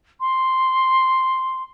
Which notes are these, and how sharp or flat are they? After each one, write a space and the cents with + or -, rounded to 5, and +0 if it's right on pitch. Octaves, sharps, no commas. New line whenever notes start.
C6 +0